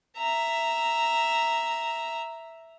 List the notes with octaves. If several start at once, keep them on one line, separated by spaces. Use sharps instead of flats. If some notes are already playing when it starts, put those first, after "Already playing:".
E5 A#5